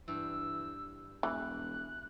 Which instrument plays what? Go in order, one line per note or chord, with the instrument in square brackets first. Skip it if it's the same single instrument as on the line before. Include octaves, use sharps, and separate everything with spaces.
[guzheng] G2 [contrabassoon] E3 [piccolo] E6
[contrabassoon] E1 [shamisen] E3 [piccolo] F#6